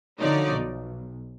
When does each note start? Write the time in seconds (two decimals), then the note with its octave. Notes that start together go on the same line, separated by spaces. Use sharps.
0.19 D3 F3 D#4 F#4 C#5 D5
0.52 B1